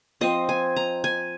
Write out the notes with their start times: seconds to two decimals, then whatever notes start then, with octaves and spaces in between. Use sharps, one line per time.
0.21 F3 C4 D#5
0.49 G#5
0.76 A#5
1.04 G#5